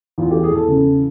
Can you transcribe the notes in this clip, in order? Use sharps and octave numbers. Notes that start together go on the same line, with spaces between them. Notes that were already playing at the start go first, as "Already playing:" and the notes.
E2 F4
G4
E3
G#4
E2 A4
C#3 A4
E3